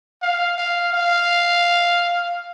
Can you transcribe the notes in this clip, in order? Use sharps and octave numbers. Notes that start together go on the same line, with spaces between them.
F5
F5
F5